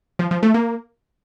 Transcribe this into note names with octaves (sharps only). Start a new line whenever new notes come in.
F3
F3
A3
A#3